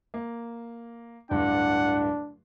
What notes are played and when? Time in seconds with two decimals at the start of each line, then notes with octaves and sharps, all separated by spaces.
0.14 A#3
1.31 D1 G2 D4 F#5